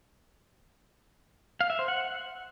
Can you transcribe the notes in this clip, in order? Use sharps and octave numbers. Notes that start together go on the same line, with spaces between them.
F5
E5
C5
F#5